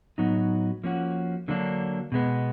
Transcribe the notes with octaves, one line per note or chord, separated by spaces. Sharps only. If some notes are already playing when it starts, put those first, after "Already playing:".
A2 F#3 B3 D#4 F#4
F3 A#3 C#4 F#4
D3 F#3 A#3 D4
B2 G#3 B3